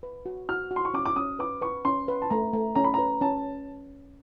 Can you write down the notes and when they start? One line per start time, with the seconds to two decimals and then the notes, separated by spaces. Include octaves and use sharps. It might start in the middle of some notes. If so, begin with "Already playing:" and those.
0.03 B4
0.26 F#4
0.49 F#4 F6
0.71 F#4
0.76 C6
0.85 C#6
0.94 C#4 D6
1.05 D6
1.16 C#4 D#6
1.39 B4 D6
1.62 B4 C#6
1.85 C#4 C6
2.08 B4
2.22 A5
2.30 A3 A#5
2.53 A3
2.75 C#4 A#5
2.84 B5
2.94 B4 A#5
3.21 C#4 A5